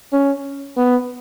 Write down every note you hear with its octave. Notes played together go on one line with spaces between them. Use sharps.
C#4
B3